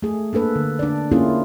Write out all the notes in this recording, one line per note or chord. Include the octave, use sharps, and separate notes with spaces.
A3 G#4
A#3 D4 A4 B4
D3
D4 D5
A#3 C#4 E4 F4 G#4